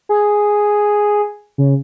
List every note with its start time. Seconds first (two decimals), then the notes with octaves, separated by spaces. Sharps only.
0.09 G#4
1.58 C#3